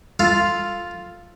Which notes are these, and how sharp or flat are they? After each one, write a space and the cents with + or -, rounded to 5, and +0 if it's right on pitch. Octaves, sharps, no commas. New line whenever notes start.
F4 +0 A4 +0 F5 -5